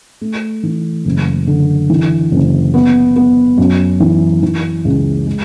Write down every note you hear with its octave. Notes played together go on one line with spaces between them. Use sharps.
A3
E3
F#1
D3
E3
F#1
B3
B3
F#2
E3
E3
C#2
G#3